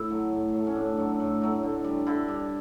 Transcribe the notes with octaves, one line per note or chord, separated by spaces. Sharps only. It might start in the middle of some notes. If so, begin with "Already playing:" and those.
Already playing: A2 E4
F#3 A3
A2
F#3 A3
C#4
A2 D4
F#3 A3
A2
F#3 A3
D3
G3
D3 E4
G3